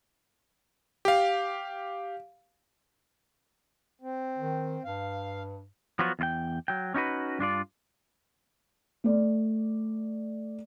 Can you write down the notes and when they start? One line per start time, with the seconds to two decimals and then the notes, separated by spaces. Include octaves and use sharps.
1.05 G4 F5
4.02 C4
4.38 D#3
4.85 G2 F5
5.99 F3 F#3 B3 F4 F#4
6.19 E2 F4 G5
6.68 F#3 G5
6.94 C#4 D#4 F#4 B4
7.39 G2 D4 F4 D5
9.04 A3 D5